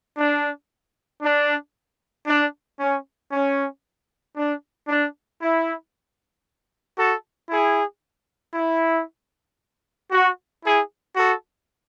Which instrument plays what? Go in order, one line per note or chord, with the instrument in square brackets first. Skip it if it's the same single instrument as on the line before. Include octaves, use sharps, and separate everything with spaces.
[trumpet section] D4
D4
D4
C#4
C#4
D4
D4
E4
F#4 A4
E4 G#4
E4
F#4
E4 G#4
F#4 A4